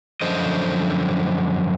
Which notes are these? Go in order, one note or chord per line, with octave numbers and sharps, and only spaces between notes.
F#2 D3 F3 C5 D#5